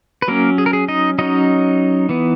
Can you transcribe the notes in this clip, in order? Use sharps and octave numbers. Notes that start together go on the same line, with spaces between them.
B4
F#3 A#3 C#4 A#4
G#4
A#4
G#4
D#4 D#5
F#3 C#4 D#4 D#5
E3 B3